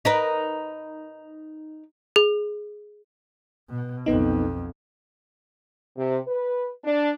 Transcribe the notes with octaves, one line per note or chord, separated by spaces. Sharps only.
D#4 A#4 B4
G#4
B2
B1 F2 B3 D#4
C3
B4
D4